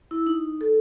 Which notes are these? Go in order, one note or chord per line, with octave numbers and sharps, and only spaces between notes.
E4
D#4
A4